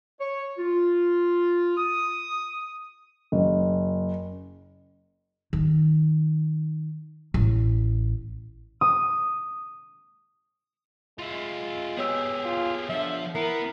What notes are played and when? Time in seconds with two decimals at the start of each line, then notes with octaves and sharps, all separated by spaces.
0.19 C#5
0.58 F4
1.77 D#6
3.32 F#1
5.53 D#3
7.34 A1
8.81 D#6
11.19 G#3 F4 E5
11.97 B3 G4 G#4 C#5 E6
12.45 F4
12.89 D3 F3 E5
13.35 B3 E4 A#4 C7